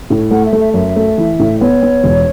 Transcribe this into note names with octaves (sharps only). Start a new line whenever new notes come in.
A2
A3 F#5
E5
A3
E5
F#2 E5
A3
E3
A2
B3 C#5
B3
E1